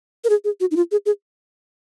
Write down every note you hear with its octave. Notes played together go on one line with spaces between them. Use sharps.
A#4
G#4
G#4
F#4
D#4
F4
G#4
G#4